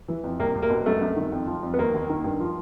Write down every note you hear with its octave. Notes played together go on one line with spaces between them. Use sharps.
E3
F2
C2 A#3
C2
A#3
B2
F#2 A3
F#2
D#3
F2
F3
F2
B3
D#2 A#3
D#2
D#3
G2
F3